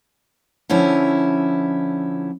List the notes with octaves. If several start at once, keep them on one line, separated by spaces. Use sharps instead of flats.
D3 F3 C#4 E4